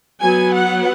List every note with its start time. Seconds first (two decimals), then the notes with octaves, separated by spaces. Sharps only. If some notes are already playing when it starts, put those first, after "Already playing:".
0.21 F#3 B3 G#5
0.54 F#5